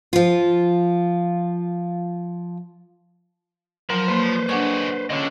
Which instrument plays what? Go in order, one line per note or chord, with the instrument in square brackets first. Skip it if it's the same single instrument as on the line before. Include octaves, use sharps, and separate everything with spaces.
[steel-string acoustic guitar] F3 F4
[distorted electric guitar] F3 [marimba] F#3 [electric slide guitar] A#4
[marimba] A#3 [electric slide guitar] B4 C5
[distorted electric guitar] G#3 F#4 [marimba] D4 F#5 C#6
[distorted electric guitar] D3 [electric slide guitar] C#4 C#5 D#5